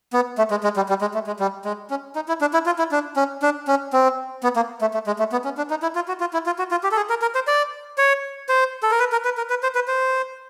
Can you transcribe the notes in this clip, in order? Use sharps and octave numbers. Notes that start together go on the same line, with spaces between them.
B3
A3
G#3
G#3
G3
G3
G#3
A3
G#3
G3
G#3
C#4
D#4
E4
D4
E4
F4
E4
D4
C#4
D4
C#4
C4
B3
A#3
A3
A3
G#3
A3
B3
C#4
D4
D#4
E4
F4
F#4
F4
E4
F4
F#4
F4
G4
A4
G#4
A#4
A#4
C5
D5
C#5
C5
A4
A#4
B4
A#4
B4
A#4
B4
C5
B4
C5